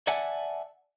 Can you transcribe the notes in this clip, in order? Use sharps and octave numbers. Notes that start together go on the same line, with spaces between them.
D5 E5 F#5 G#5 A5